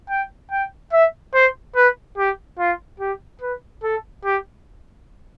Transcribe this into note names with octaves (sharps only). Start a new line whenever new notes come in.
G5
G5
E5
C5
B4
G4
F4
G4
B4
A4
G4